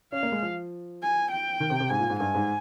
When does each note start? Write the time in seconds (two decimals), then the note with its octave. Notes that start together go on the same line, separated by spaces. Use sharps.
0.12 C#4 F5
0.23 A#3
0.32 G#3
0.42 F3
1.02 G#5
1.31 G5
1.60 D#3
1.70 C3
1.80 C3
1.89 G#2 G#5
1.99 A#2
2.10 G#2
2.19 G2 G#5
2.34 G#2